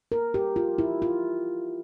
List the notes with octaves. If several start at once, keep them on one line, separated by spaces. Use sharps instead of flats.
A#4
G4
F4
E4
F4